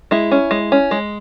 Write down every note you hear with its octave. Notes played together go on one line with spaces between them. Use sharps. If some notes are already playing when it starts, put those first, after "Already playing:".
G#3 E4
C#4
G#3
C#4
G#3